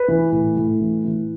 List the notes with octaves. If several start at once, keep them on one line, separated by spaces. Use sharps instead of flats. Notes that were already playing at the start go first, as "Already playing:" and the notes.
Already playing: B4
E3
A2
A2
E3
E3